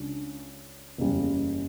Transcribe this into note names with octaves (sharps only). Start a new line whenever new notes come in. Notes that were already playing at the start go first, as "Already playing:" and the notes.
Already playing: C#2 C#3 D4
F#1 E2 C#3 G3